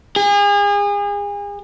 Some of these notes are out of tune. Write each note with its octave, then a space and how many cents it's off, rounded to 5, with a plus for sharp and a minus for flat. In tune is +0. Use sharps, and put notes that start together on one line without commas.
G#4 -35